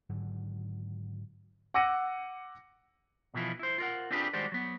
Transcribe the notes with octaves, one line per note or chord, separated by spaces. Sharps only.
G#1 G#2 D3 F#3
F#5 D6 E6 A#6 C#7 D#7
B1 B2 E3 F3 E4 F4
E4 C5
F4 A#4 F#5
C4 D4 F4 G4 G#4 B4
D#3 G3 G#3 F#4 C5 D5
F#3 B3